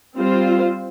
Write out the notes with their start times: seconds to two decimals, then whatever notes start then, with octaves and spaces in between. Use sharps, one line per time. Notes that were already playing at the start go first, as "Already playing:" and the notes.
0.17 G3 C4 F4 C5